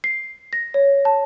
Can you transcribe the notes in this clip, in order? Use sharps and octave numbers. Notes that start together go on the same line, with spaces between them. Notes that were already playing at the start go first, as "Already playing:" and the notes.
C7
A#6
C#5
A5